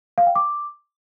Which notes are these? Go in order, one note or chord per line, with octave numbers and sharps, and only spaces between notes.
F5
G5
D6